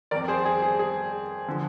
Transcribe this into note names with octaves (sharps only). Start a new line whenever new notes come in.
F2 D#3 A#4 D5
G#4 C5
G#4
G#4
G#4
D3 F3